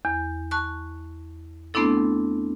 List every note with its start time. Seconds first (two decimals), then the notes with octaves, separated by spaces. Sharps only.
0.05 E2
0.51 A5 C#6 F#6
1.74 A3 B3 C4 D4 E4 A4